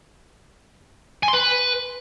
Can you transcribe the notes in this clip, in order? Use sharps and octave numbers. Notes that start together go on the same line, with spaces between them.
G#5
C6
B4